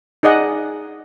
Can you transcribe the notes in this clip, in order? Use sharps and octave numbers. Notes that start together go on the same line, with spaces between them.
D#4 G#4 D5 D#5 F#5